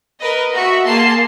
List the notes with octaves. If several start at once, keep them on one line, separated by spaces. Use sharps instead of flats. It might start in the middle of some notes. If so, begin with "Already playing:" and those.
A#4 B4 D#5
F#4 E5
A#3 G#4 A5 C6 C7